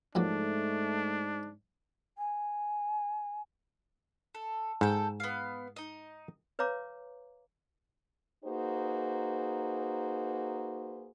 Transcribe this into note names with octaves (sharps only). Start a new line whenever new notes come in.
F2 G#2 F#3 A3 A#3 D4
G#5
A4
G#2 A4 G5
B3 F5
D#4 D#5
B4 C#5 F5 A#5 D6
A#3 D#4 F#4 G#4 B4 C5